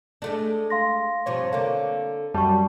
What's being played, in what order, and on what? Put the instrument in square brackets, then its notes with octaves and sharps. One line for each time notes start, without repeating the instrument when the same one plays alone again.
[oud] G#3 A3 D4
[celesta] F5 C6 A#6
[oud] G2 C3 F3 [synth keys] C#5
[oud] D3 A#3 [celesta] F5
[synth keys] F#2 G3 [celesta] A5 C#6